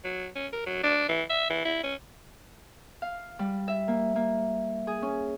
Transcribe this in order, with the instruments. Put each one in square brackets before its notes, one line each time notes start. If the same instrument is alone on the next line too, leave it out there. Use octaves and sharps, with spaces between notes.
[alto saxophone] F#3
C#4
A#4
F#3
D4
E3
E5
E3
E4
C#4
[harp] F5
G3
E5
A#3
A#3
G#4
C#4